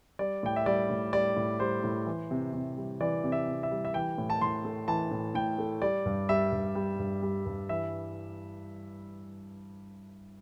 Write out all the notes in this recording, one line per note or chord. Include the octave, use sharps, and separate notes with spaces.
G3 D5
A2 G5
E5
G3 D5
A2
G3 D5
A2
G3 C5
A2
E3
C3
C3
G3
E3 D5
C3
E5
C3
E5
G3
E5
E3 G5
A2
A5
A2 C6
A3
E3 A5
A2
A2 G5
A3
G3 D5
G2
G3 E5
G2
G3
G2
G3
G2
E3 E5